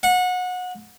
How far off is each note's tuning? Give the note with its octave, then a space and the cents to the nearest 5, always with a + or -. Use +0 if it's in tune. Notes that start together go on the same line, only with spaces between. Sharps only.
F#5 -25